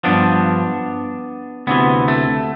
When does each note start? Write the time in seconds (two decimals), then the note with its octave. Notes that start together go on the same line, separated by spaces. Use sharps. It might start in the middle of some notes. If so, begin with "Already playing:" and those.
0.04 G2 F3 B3 D4
1.67 D2 C3 E3 B3
2.08 A3